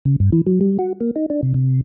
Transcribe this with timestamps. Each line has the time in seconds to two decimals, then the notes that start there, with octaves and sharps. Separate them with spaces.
0.05 C#3
0.20 G2
0.32 E3
0.47 F#3
0.61 G3
0.79 F#4
1.01 A#3
1.16 D#4
1.30 D4
1.43 C3
1.54 C3